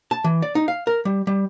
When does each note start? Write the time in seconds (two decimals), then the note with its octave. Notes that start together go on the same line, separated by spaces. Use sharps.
0.11 A5
0.24 E3
0.42 D5
0.55 D#4
0.68 F5
0.87 A#4
1.05 G3
1.27 G3